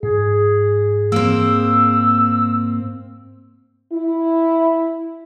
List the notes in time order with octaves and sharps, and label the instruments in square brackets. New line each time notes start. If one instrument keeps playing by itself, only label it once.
[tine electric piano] G#2 [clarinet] G#4
[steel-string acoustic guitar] A#3 C4 [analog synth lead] E6
[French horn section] E4